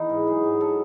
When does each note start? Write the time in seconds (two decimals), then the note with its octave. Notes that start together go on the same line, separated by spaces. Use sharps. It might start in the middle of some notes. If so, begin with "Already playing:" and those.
Already playing: E3 B3 D#4
0.10 G#2
0.27 F#3 G#4
0.44 G#2
0.61 F#3 A4